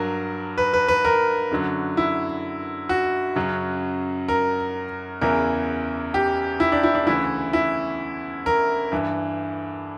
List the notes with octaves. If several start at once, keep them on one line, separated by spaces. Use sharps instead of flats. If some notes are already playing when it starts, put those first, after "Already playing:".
Already playing: G2 F#3 A#4
B4
B4
B4
A#4
F#2 D3 F#3
E4
F#4
F#2 C#3 F#3
A#4
E2 C#3 E3 A#4
G4
E4
D4
E4
D4
D2 C#3 E3 E4
E4
A#4
G2 E3